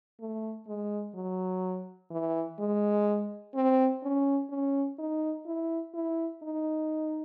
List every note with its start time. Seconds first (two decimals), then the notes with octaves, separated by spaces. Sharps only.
0.20 A3
0.67 G#3
1.15 F#3
2.11 E3
2.59 G#3
3.55 C4
4.03 C#4
4.50 C#4
4.98 D#4
5.46 E4
5.94 E4
6.43 D#4